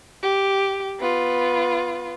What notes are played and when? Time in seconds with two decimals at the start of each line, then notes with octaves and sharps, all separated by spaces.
0.22 G4
1.00 B3 F4